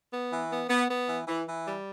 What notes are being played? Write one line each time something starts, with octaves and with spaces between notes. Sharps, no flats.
B3
E3
B3
B3
B3
E3
E3
E3
G3